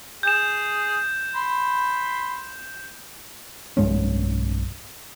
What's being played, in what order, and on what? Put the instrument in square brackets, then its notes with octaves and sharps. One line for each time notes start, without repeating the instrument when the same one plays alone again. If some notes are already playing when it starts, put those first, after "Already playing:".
[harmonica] G#4 [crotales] G6 E7
[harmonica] B5 C6
[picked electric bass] B1 G2 G#3 C#4